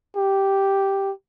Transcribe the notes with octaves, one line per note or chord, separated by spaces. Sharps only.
G4